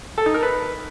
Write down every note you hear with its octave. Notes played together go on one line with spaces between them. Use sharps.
A4
D#4
A#4
B4